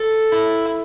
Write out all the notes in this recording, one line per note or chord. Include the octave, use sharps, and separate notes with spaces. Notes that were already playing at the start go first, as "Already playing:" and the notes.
Already playing: A4
E4